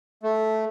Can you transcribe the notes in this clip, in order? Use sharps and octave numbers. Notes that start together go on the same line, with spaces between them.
A3